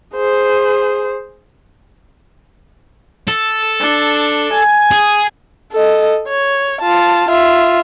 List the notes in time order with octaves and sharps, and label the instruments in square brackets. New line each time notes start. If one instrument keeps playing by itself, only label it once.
[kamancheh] G#4 C5
[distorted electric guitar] A4
[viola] D4
G#5
[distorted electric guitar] G#4
[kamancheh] A4 D#5
C#5
F4 A5
F4 E5